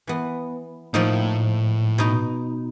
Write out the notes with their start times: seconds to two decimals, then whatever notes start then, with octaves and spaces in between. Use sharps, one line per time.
0.07 E3 B3
0.94 A2 F3 A#3 D#4
1.98 B2 D#4